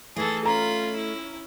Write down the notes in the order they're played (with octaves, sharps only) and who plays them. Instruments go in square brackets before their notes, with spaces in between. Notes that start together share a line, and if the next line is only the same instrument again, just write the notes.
[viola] E3 A4 [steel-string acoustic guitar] A3 D#4 [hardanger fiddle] G#4
[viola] C#4 [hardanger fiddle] F4 B5 [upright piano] A#5
[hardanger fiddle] E4